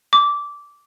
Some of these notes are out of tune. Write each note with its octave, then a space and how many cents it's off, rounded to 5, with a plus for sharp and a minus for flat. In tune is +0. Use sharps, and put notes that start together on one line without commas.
D6 -15